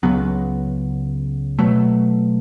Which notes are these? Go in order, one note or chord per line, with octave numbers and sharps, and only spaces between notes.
C#2 C#3 F#3 B3
B2 F#3 A3